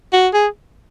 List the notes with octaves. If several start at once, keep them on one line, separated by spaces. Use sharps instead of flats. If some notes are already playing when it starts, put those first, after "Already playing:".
F#4
G#4